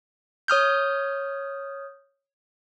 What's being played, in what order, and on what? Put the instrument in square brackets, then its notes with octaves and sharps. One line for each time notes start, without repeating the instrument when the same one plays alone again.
[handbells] C#5 D#6 F6 G6